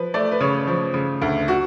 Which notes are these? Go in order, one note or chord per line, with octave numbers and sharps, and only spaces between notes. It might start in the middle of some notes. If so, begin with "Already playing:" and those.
Already playing: F3 B4
A3 D5
B4
C#3 C#5
F3
C#3
D2
F#4